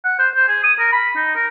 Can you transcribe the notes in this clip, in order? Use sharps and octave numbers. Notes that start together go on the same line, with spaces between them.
F#5
C5
C5
G#4
D#6
A#4
B5
D#4
A#4